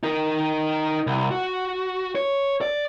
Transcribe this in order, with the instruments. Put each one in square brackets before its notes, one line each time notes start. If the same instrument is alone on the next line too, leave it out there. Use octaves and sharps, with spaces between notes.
[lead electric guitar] D#4 A#4
C2
F#4
C#5
D5